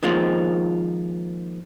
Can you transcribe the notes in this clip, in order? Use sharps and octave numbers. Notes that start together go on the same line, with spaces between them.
D#3 F3 G#3 A#3 C4 F4